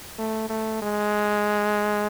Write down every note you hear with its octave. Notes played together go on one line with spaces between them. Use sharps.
A3
A3
G#3